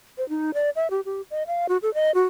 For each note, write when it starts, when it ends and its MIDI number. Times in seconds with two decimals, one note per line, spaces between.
0.18 0.27 72
0.29 0.51 63
0.54 0.70 74
0.76 0.90 76
0.90 1.01 67
1.05 1.22 67
1.31 1.43 75
1.47 1.66 77
1.69 1.77 66
1.82 1.93 69
1.94 2.11 75
2.14 2.23 66